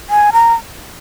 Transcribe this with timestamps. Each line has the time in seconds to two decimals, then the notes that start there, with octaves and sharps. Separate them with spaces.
0.10 G#5
0.33 A#5